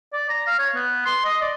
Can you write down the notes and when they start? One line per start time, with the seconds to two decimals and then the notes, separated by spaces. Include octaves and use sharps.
0.13 D5
0.29 A#5
0.47 F5
0.59 C#5
0.75 B3
1.06 C6
1.25 D#5
1.41 D5